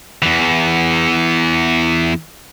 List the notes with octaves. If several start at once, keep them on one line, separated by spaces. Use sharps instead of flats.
E2 E3